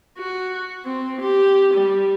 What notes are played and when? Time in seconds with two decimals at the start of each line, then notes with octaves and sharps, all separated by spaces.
0.18 F#4
0.86 C4
1.21 G4
1.74 G3